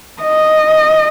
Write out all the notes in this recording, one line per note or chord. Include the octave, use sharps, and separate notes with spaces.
D#5